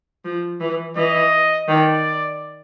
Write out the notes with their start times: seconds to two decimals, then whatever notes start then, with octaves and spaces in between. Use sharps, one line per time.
0.25 F3
0.61 E3
0.96 E3 D#5
1.68 D#3 D5